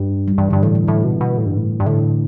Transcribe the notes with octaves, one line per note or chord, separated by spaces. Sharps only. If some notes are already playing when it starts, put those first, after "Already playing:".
Already playing: G2
G3
G2 E3
G2 D3
A2 E3
E3
A2 E3
B2
B2
A2
G2
A2
G2
A2 D3